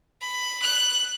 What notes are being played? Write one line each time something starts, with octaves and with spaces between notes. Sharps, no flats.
B5
F#6